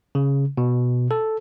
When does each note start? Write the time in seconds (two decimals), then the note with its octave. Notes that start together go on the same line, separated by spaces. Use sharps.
0.15 C#3
0.57 B2
1.11 A4